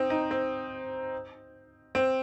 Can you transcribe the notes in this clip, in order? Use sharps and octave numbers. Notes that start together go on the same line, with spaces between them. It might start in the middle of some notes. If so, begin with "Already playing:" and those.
Already playing: C4 D#4
D#4
C4
C4